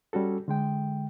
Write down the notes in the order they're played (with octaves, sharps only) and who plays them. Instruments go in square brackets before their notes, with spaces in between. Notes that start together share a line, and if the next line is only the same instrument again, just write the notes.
[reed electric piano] G3 C#4 F#4 A4
D3 G#3 G5